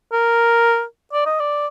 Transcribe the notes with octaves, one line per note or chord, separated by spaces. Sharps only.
A#4
D5
D#5
D5